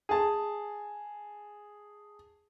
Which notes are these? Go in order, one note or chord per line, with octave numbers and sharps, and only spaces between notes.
G#4 A5